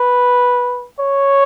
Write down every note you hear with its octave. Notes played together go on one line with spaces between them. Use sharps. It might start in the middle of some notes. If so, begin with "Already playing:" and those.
Already playing: B4
C#5